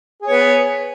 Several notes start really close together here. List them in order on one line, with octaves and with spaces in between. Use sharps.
G#4 C#5 B3